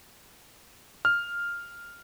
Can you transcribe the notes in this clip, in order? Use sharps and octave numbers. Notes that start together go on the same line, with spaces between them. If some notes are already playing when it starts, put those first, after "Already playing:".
F6